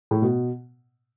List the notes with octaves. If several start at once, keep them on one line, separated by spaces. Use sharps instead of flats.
A2
B2